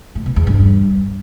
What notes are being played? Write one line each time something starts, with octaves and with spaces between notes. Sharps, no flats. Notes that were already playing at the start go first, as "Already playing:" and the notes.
A2
B2
E2
G2